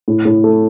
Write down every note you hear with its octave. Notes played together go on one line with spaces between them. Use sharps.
A2
A2
A3